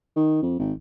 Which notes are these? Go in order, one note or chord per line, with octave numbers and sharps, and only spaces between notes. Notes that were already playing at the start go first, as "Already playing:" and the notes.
D#3
F2
G#1